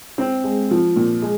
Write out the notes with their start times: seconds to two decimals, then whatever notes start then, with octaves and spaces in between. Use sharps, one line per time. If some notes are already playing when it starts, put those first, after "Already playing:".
0.18 C4
0.44 G#3
0.71 F3
0.96 A#2
1.22 G#3